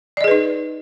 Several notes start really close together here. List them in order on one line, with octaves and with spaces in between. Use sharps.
D5 D#5 G#4 B4 D#4